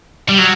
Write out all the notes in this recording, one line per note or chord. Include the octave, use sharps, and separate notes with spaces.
G3
F#3